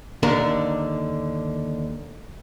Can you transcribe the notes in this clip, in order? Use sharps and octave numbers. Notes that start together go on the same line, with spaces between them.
D#2 D3 D4 A4 A#4